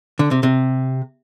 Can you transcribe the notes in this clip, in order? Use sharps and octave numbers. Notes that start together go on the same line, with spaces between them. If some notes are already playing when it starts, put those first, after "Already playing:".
D3
C3
C3